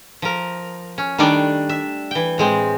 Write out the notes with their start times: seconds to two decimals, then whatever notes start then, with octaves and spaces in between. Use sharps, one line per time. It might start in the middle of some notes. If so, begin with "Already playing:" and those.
0.22 F3 A#4
0.98 C#4
1.18 D#3 G3 A3 D4 D5
1.69 E5
2.11 E3 G5
2.38 A2 G#3 C4